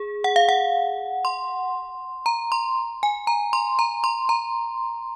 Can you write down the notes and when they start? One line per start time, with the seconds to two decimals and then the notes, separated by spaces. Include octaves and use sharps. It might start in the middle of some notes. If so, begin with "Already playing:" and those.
Already playing: G#4
0.24 F#5
0.36 F5
0.49 F#5
1.25 C6
2.26 A#5
2.52 C6
3.03 G#5
3.27 A#5
3.53 C6
3.79 A#5
4.04 C6
4.29 A#5